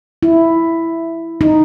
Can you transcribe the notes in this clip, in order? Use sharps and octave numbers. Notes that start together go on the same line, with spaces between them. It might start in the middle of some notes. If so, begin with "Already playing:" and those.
E4
D#4